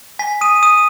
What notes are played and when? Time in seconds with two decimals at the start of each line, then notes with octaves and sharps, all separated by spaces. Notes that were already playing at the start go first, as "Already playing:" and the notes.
0.19 G#5 B6
0.41 D#6 D#7
0.63 D#6 D#7